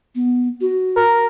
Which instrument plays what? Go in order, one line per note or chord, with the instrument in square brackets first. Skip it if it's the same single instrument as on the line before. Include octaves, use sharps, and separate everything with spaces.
[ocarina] B3
F#4
[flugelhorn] A#4